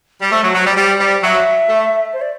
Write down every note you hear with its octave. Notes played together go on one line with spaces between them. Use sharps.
G3
A3 C5
F#3
F#3
G3
G3
G3
F#3 E5
A3
C5
D5